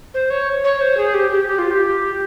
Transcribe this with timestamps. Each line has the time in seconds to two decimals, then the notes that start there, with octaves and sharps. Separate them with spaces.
0.14 C5
0.30 C#5
0.64 C#5
0.81 C5
0.97 G#4
1.14 G4
1.31 G4
1.47 G4
1.59 F4
1.71 G4